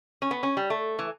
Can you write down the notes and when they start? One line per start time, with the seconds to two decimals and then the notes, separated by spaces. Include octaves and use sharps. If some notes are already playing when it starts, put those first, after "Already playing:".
0.22 C#4
0.31 B3
0.43 C#4
0.57 G3
0.70 A3
0.99 E3